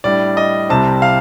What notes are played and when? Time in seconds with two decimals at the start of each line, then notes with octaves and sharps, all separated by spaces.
0.04 A2 G3 D4 D5
0.37 D#5
0.69 C2 C3 G3 C4 A5
1.02 F5